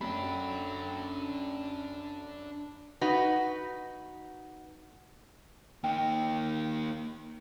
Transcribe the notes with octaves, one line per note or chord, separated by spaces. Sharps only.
F#2 C#4 D4 A4 G5 B5
D#4 F#4 B4
A#3 D#4 G5